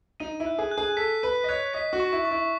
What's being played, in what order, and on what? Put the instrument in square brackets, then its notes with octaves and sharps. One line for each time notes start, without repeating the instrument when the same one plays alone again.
[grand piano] D#4 [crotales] D#7
[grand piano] E4
[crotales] F#6
[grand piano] G#4
[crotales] F#6
[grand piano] G#4
[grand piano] A4 [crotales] B6
[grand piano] B4 [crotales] D#7
[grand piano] D#5
[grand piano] C#5 [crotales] F#6
[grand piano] D#5 [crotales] B6
[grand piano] F#4
[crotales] C#6
[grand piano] E4
[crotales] C#6
[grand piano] E4